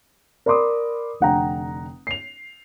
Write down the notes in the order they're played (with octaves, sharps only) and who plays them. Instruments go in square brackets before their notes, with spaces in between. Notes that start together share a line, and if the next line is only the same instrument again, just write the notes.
[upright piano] A#4 D5 B5 C6 D6 D#6
F1 D3 F#5 G5 A#5
C7 F7